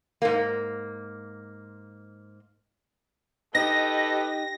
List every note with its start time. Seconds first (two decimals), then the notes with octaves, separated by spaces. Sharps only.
0.22 G#2 A#3
3.55 D#4 G4 A4 B4 D#5 A#6